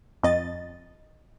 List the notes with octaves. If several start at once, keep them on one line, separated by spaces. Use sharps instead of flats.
F2 D#5 A6